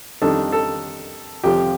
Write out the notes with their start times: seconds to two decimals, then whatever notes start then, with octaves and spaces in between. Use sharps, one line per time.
0.22 F2 D#3 G3 D4 A4
0.52 A4
1.44 F2 C3 F3 G4